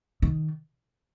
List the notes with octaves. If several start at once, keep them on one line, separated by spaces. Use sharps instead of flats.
D#3